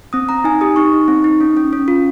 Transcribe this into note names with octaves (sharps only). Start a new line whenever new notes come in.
C4 D#6
C4 A#5
D#4 G#5
G4 D#6
D#4 C#6
D#4
C4
D#4
C#4
C#4
C#4
F4